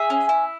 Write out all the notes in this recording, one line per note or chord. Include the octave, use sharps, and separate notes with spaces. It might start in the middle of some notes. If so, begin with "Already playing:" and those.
Already playing: G#4 E5
C#4
E4